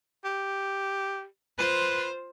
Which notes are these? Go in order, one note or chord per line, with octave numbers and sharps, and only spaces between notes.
G4
F4 B4 C5